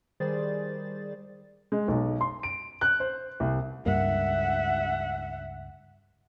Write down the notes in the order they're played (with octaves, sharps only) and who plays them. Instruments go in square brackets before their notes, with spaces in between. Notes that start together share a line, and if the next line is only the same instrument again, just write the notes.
[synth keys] D#3 G3 G#4 C5 D5 A6
[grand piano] G#3
B1
C6
D7
F#6
C5
C2
[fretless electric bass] C#2 G2 A#3 [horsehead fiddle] E5 F#5